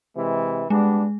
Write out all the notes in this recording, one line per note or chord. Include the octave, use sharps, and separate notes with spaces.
C3 E3 G#3
G3 G#3 B3 D4